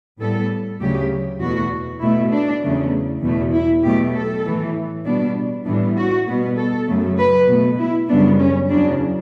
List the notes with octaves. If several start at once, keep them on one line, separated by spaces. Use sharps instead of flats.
A2 G3 B3 A4
D2 C#3 F#3 G4
E2 B2 A3 F#4
B2 A3 E4
D4
E2 C#3 F#3 A3
E2 B2 A3
E4
B2 F#3 A3 G4
A4
A2 E3 A3
B2 G3 B3 D4
A2 E3 G3 B3 D4
F#4
B2 G3 B3
A4
F#2 C#3 F#3 A3
B4
B2 A3
E4
F#2 C#3 G3 B3 D4
C#4
E2 C#3 F#3 D4